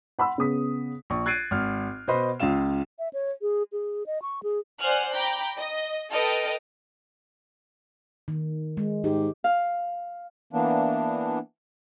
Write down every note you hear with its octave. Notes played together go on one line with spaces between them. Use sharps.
F#5 B5 C6 E6
C#3 B3 D#6 B6
A#1 C#6
F#6 G#6 A6 C7 D7 D#7
G#1 F6
B2 B4 C5 D#5 B5 C6
C#2 C#3 F4 F5 E7
E5
C#5
G#4
G#4
D#5
C#6
G#4
C5 D5 F#5 G#5 F6 F#6
G5 A#5 B5 D6 G6
D#5
A4 B4 D#5 G5 F6
D#3
G#3
G#2 G4
F5
E3 A#3 B3 D4